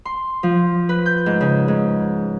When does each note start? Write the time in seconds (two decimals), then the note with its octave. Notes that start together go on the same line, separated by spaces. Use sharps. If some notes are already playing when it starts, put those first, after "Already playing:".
0.05 C6
0.43 F3
0.89 B4
1.06 G6
1.26 G#2
1.41 C#3
1.68 G#2